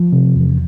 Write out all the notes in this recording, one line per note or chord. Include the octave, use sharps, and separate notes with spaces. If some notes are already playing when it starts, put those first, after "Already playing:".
Already playing: F3
C3
E2